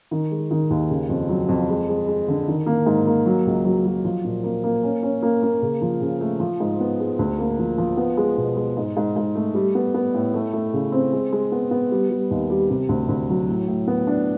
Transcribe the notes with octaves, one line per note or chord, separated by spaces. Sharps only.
D#3
G#3
D#3
D#2
C#3
F2
F#3
F2
G#3
G#3
G#3
D3
D#3
A#3
G#2
A#3
F#3
C#2
F#3
F#3
F3
A#2
A#3
A#3
C#4
C#4
A#3
A#3
C#3
F3
C#3
A3
F3
G#2
B3
G#3
D2
A#3
F3
F3
B3
G#3
B2
G#3
G#2
G#2
G#2
A3
G3
B3
B3
A2
A3
A3
C#3
C4
G#3
G#3
B3
B3
G3
G3
D#2
G3
C3
D2
D2
F#3
A2
A2
B3
D4